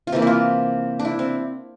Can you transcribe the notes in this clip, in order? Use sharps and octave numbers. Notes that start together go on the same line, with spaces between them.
F4
C3 E3 A#3 G4
E4 F4
D4
E4
C4